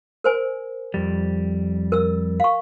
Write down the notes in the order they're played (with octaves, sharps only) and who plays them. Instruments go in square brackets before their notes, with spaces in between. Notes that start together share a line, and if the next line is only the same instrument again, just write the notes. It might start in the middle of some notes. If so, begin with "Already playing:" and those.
[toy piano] A#4 C5 G#5
[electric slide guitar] F2 G3
[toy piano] A#4 E6
F5 C#6